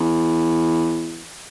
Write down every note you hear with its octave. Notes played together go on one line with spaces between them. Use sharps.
E2